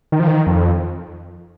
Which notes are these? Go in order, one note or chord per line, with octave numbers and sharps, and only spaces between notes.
D#3
F3
D#3
F2